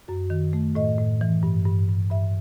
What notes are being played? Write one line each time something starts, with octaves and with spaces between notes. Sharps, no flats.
F#2 F#4
D#3
A3
A2 D#5
A2
E3
G2
G2
G2
G2 E5